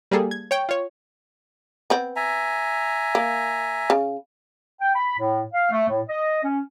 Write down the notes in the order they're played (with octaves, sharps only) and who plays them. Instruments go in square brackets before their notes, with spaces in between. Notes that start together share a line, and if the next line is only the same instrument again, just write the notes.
[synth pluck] G3 A#3 G#4 A4
G#6
C#5 G5
F4 C#5
[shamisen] B3 C4
[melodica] E5 G#5 A#5
[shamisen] A#3
C#3
[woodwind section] G5
B5
A2
F5
A3
A2
D#5
C#4